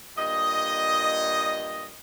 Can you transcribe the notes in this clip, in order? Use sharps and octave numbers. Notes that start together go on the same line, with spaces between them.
G2 A#2 D#5